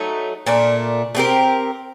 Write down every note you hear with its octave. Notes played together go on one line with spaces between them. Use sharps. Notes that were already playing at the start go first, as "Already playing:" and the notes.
Already playing: F#3 A3 D#4
A#2 A3 D4
A3 C4 G4 A#4